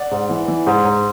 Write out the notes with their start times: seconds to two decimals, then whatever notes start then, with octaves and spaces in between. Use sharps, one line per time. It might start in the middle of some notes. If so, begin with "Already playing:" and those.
Already playing: D5 F#5
0.11 G#2
0.30 E3
0.48 E3
0.67 G#2
0.85 G#2